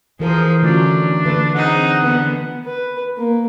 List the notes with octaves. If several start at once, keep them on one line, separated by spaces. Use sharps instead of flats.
E3 F3 G#4 A#4 C5
D3 F#3 A3 C#4 D4 F4
D3 A3 B4
C4 D#4 G#4 F#5
D3 B3 B4
B4
A#3